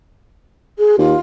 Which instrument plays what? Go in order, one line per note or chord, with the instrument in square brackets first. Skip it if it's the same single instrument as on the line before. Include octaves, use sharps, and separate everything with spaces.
[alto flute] G#4
[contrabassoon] D#2 [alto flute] F4